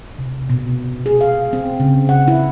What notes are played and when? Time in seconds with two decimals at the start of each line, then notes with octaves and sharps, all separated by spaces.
0.19 C3
0.50 B2
1.06 G#4
1.21 F5
1.53 C4
1.80 C#3
2.09 F#5
2.28 E4